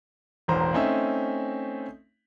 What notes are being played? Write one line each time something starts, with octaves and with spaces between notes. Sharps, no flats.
E1 A1 C5 A#5
A3 C4 C#4 D#4 E5